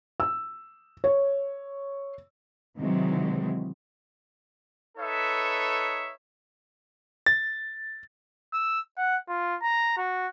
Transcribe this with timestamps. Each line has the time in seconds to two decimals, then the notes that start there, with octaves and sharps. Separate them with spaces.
0.20 E6
1.04 C#5
2.78 C3 D#3 E3 F#3 G#3
4.98 D#4 A4 B4 C#5 E5
7.26 A6
8.53 E6
8.98 F#5
9.29 F4
9.62 A#5
9.97 F#4